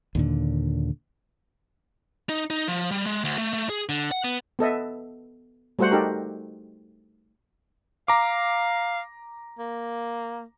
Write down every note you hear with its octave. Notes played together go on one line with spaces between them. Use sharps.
D#2 A#2 D3
D#4
D#4
F3
G3
G#3
D2
A3
A3
G#4
D3
F#5
B3
B3 A4 D#5 E5
G3 A3 F#4 C5 F#5
D#4 G4 A4 A#4
F5 A#5 D6
A#3